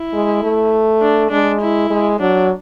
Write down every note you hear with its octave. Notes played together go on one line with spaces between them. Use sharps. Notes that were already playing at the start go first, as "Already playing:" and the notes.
Already playing: E4
G#3
A3
D4
G#3 D4
E4
G#3
F#3 D4